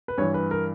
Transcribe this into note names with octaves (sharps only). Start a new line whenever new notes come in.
B4
G2 E3 C#5
B4
A#4